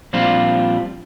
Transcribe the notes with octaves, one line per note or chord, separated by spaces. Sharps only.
A#2 F3 G3 C4 D4 F4